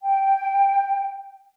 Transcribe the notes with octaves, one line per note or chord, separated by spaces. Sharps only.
G5